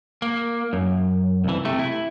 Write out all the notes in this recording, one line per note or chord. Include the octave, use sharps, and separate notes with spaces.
A#3
F#2
C2 E3
C3 A3
E4